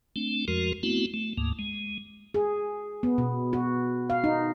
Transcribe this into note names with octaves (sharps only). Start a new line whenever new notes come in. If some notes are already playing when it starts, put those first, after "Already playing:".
A3 C4 D4
F2 F3 G#3 F#4 A#4
A3 B3 C4 E4 F#4
A3
D2 G#2 A#3
G#3
G#4
B3
B2
F#4
F5
D#4